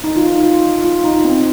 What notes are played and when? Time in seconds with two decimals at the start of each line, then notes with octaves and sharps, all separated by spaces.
0.04 D#4
0.16 F4
0.27 D#4
0.44 F4
0.85 F4
1.04 D#4
1.24 C4